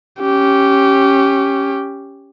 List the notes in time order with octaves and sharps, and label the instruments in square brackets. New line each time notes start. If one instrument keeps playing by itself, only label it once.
[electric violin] C#4 G4